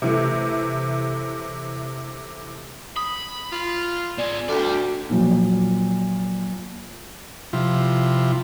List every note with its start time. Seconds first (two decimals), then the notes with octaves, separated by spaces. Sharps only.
0.02 C3 E3 A3
2.97 B5 D#6
3.52 F4
4.18 C4 G#4 D5
4.49 D2 F#4 A4 D5 G5
5.10 A#2 F3 F#3
7.53 C3 F3 E4 F4